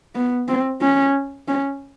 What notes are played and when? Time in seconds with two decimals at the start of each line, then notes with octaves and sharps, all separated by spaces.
0.15 B3
0.48 C4
0.82 C#4
1.48 C#4